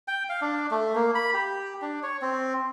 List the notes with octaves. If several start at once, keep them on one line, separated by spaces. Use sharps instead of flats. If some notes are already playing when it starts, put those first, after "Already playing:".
G5
F5
D4
A3
A#3
B5
G4
D4
C#5
C4